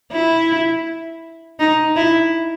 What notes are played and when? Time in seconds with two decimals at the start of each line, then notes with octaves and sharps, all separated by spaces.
0.12 E4
1.59 D#4
1.96 E4